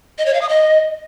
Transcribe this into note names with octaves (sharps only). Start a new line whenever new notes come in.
D#5
C#5
F5
D#6
D#5